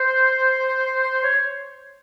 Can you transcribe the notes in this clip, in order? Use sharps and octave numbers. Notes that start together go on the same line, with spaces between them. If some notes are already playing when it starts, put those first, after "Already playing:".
Already playing: C5
C#5